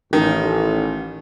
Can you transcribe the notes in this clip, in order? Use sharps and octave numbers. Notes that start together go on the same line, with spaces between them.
A1 D#3